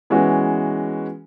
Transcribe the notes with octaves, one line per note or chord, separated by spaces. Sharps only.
E3 G#3 B3 C#4 F#4